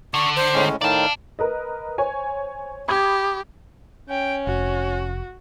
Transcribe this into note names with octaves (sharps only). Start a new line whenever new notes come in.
D3 C#6
C5
A2 G#3 C#4
A2 D#3 D#4 D5 F5 A5
A#4 B4 D#5
C5 C#5 G#5
G4 B5 D#6 G#6
C#4 G5
F1 F#4